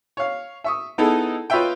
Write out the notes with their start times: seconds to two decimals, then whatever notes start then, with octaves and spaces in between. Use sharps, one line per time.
0.17 C#5 F5
0.64 E5 C#6 D#6
0.98 B3 D#4 E4 G#4 A4
1.50 F4 B4 C#5 D#5 E5 G5